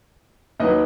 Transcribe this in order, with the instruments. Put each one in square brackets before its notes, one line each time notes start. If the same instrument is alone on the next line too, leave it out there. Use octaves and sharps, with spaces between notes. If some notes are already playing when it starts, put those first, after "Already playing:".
[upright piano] D#2 D#3 F#3 B4 D#5